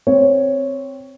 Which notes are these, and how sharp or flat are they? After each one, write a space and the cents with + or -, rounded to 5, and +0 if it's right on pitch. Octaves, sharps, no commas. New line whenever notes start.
C4 +0 C#5 +0